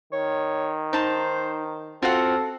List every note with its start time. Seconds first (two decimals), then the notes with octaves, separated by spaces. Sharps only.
0.13 D#3 C#5
0.93 D#4 C5 A5
2.02 C4 F4 F#4 A4 F#5